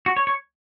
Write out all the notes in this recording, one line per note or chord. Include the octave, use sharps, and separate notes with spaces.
F#4
C#5
C#5